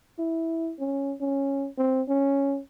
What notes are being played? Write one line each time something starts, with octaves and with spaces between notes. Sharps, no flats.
E4
C#4
C#4
C4
C#4